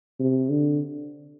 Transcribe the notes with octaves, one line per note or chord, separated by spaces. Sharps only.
C3
D3